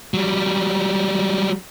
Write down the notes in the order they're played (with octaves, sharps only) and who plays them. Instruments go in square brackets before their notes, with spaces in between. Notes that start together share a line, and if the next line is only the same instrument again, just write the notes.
[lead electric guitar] F#3 G3